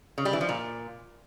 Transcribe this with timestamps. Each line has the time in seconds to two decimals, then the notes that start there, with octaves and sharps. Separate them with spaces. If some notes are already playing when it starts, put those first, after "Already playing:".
0.18 C#3
0.25 G3
0.33 E3
0.41 F3
0.49 A#2